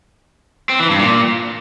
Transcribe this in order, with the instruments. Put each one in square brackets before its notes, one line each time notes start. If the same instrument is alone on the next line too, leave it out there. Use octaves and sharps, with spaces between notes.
[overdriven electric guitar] C4
E3
G2
A#2